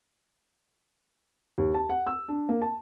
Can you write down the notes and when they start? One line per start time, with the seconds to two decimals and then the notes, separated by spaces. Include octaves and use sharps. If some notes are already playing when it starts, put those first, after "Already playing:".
1.58 D#2
1.74 A5
1.89 F#5
2.07 E6
2.28 D4
2.49 A#3
2.62 A5